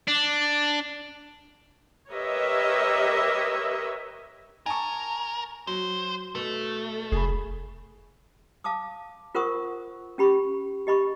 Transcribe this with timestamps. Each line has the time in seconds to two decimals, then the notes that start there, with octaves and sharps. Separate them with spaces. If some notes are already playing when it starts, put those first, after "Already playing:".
0.08 D4
2.12 G4 A#4 B4 C#5 D#5 E5
4.66 A#4 G#5 A5 C#6
5.67 F#3 C5
6.35 B2 A3
7.12 F1 G#4 B5
8.64 F5 A5 D6 D#6
9.35 F4 A#4 C5 F#5 C#6 D#6
10.18 C#4 G4 B5 C#6
10.87 G4 D#5 B5 C#6